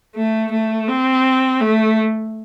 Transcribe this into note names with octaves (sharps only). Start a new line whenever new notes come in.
A3
A3
C4
A3